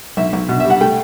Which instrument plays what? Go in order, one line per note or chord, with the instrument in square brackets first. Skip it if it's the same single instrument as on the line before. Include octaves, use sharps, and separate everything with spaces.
[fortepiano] B1 E5
B1
B2
G3 E5
F#5
A3 G5